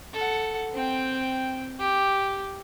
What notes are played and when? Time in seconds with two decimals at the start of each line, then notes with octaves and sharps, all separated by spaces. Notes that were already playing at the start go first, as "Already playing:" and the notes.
0.13 A4 F#5
0.73 C4 G5
1.79 G4